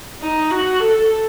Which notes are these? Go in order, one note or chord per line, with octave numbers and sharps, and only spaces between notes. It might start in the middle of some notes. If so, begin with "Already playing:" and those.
D#4
F#4
A4